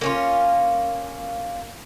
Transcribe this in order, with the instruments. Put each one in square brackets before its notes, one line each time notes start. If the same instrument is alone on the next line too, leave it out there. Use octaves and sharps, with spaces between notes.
[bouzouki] A#3 C#4 F4